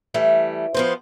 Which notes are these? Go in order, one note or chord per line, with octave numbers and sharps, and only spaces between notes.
E3 G3 A3
F3 B3 C5